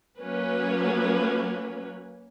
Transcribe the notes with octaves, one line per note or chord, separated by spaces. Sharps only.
F#3 A#3 C#4 B4